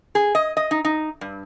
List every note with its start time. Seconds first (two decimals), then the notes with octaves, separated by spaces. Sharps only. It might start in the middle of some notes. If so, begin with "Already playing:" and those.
0.15 G#4
0.35 D#5
0.57 D#5
0.71 D#4
0.85 D#4
1.21 G2